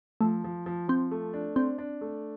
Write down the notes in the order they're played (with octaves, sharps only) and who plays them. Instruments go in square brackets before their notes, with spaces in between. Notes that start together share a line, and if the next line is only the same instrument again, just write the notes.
[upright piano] F3 [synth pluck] A3
[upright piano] F3
F3
[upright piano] F3 [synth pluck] C4
[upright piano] A3
D4
[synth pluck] C4 [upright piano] D4
[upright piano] D4
A3